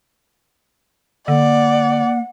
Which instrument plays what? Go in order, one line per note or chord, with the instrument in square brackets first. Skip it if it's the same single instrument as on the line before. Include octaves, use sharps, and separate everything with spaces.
[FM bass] D3 [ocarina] A#3 [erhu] D5 [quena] F#5